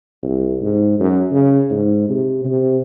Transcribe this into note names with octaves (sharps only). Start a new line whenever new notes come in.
C2
G#2
F#2
C#3
G#2
C3
C3